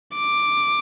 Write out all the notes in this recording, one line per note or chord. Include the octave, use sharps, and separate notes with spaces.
D6